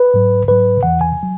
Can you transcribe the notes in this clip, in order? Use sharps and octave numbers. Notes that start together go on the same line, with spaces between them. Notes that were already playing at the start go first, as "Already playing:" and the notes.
Already playing: B4
G#2 F#3
G#2 F#3 B4
E2 E3 F#5
G#5
F#3